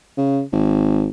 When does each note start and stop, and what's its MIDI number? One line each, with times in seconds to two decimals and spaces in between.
0.17 0.42 49
0.52 1.10 32